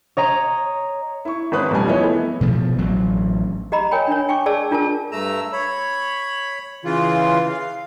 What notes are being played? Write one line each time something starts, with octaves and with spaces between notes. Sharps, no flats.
C#5 D#5 A#5
E4 C#6
G#1 C#4 B4 B5 D#6 F#6
F2 B2 G3 G#5
F3 B3 E4 B4 C#5 D#5
E3 A3 B3
B2 F3 A3
A1 F#3
G4 D#5 A#5 B5
A#4 C#5 G5 G#5 B5
D4 C#5
G5 G#5 C#6 D6
G#4 D5 A5 E6
D4 F4 A#4 A5
G2 A3 A#5 E6
C#5 B5
C#3 E3 F4
F5